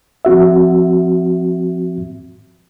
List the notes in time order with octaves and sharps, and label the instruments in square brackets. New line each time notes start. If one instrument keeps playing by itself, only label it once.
[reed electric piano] F3 C4 F#4 E5